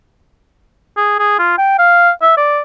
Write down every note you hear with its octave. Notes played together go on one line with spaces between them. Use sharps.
G#4
G#4
F4
G5
F5
E5
D5